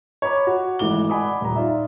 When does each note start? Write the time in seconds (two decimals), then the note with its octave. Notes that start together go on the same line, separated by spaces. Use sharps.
0.22 C#5 A#5 B5 D6
0.47 F#4
0.79 G#1 E3 A3 D6 G7
1.09 D5 F#5 G#5 B5 D6 D#6
1.41 D#1 A#5
1.56 D#4 F4 D5 E5